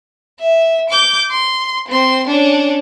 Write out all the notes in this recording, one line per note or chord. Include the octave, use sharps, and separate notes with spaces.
E5
D6 G6
C6
C4 C6
C#4 D4